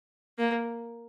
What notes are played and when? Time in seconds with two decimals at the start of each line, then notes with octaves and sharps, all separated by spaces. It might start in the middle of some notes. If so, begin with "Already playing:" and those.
0.38 A#3